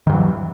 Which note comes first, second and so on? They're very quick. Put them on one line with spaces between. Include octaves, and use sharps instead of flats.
D#3 G2 F#3 E3